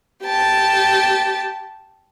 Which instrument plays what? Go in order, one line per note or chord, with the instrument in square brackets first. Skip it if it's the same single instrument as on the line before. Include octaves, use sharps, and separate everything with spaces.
[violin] G4 A5